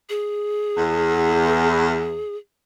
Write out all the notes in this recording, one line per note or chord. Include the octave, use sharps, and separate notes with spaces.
G#4
E2